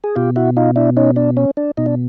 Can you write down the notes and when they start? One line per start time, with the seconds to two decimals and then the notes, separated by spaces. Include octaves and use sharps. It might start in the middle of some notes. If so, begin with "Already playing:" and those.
0.04 G#4
0.16 B2 F4 G4
0.36 E4 F#4
0.57 D#4 F4
0.76 D4 E4
0.97 C#4 D#4
1.16 D4
1.37 C#4
1.57 D4
1.77 B2 D#4
1.86 D4